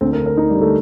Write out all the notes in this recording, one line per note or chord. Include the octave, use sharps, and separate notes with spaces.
D2 C4
A#4
D3
A#4
D2 D#4
G3
D3
A3